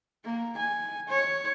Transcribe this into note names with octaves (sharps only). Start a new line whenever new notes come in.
A#3
G#5
C#5